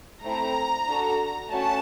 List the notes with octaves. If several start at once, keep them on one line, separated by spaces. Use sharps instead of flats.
A3 C4 E4 A#5
D4 F#4 A4
A3 C#4 F#4 A5